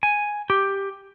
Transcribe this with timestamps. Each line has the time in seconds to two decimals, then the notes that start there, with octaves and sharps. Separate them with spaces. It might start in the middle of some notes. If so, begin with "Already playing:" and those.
0.03 G#5
0.50 G4